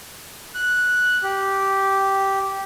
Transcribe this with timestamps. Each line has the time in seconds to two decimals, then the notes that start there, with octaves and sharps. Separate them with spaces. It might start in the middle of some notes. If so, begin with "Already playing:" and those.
0.55 F#6
1.23 G4